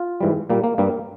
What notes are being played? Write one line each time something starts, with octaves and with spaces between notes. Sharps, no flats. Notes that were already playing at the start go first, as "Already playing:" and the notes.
Already playing: F4
G#2 E3 G3
A#2 G3 A#3
A#3
G2 G3 A#3